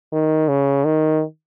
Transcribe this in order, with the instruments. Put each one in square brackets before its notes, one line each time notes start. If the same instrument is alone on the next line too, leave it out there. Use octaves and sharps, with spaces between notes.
[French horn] D#3
C#3
D#3